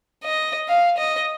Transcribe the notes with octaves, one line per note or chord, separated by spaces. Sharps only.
D#5
F5
D#5